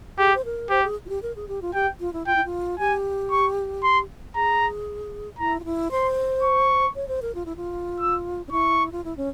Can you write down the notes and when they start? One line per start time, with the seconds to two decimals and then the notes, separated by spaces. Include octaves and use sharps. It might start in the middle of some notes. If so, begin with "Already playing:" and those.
0.18 G4 G#4
0.35 C5
0.45 A#4
0.70 G4 C5
0.84 G#4
1.06 F4
1.09 G4
1.22 A#4
1.36 G#4
1.48 G4
1.62 F4
1.74 G4 G5
2.00 F4
2.13 E4
2.26 F4 G5
2.36 E4
2.45 F4
2.79 G4 G#5
3.31 C#6
3.83 C6
4.35 G#4 A#5
5.39 E4 A#5
5.60 F4
5.65 E4
5.91 C5 C6
6.43 C#6
6.96 C#5
7.08 C5
7.22 A#4
7.35 F4
7.46 E4
7.56 F4
8.00 E6
8.47 C#4
8.52 E4 C#6
8.92 F4
9.04 E4
9.17 C#4